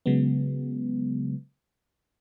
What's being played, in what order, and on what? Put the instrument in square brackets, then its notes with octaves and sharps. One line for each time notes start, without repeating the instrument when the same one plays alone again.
[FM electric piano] C#3 F#3 G#3 B3